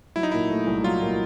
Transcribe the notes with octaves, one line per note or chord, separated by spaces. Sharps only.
F#3 E4
D#4
A#2 E4
A3
C2
F#3 F4
A#2